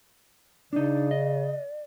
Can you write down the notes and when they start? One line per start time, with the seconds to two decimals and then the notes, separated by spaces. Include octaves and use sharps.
0.73 C#3 D4 D#4 D5
1.11 D#5